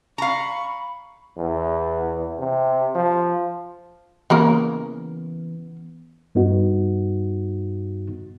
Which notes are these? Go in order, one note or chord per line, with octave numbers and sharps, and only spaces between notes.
F5 A#5 B5 C#6
E2
C3
F3
C#3 E3 A#3 B3 A#4
G2 B3 D#4 F#4